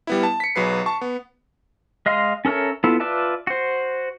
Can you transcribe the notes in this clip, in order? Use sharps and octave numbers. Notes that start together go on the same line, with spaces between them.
G3 B3 E4
A5
B6 C#7
B1 F#3 G#4 B4 C7
A5 C#6
B3
G#3 D#5 F5 C6
C#4 A4 A#4 C#5 E5
B3 E4 F4 A4
F4 B4 D5 E5 A5
F#4 C5